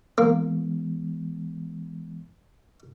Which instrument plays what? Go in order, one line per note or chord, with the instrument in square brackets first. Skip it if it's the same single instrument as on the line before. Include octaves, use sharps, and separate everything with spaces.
[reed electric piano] E3 G#3 B3 [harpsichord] A#3